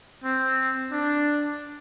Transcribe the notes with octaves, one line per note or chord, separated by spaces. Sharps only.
C4
D4